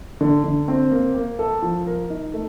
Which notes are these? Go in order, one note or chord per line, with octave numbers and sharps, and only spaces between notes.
D3
D3
C4
A#3
A#3
A4
F3
A#4
D#4
A3